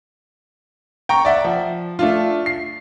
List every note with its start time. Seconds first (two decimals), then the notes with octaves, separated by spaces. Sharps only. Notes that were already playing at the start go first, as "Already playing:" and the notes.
1.09 G5 A#5 C#6
1.25 D5 E5 F#5
1.44 F3
1.99 A3 D4 F4
2.46 C7